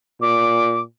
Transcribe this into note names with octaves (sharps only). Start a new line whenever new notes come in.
A#2 D6